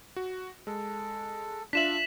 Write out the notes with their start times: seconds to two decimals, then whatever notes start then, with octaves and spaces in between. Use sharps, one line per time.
0.16 F#4
0.67 G#3 A4
1.73 D4 F4 E5 B6 E7 F#7